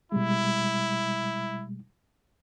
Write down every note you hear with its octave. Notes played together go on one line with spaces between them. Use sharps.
B2 G3 G#3 E4